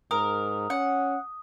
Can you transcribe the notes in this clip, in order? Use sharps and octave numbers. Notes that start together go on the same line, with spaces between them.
G#2 A#4 D#6
C#4 F#5